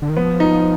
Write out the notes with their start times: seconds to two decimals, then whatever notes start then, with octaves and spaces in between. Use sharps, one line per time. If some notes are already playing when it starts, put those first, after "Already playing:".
0.02 D3
0.09 D#3
0.17 F3 B3
0.40 D#4